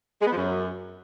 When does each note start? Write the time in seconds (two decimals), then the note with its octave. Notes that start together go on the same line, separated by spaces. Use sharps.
0.22 G#3
0.27 B3
0.32 F3
0.37 F#2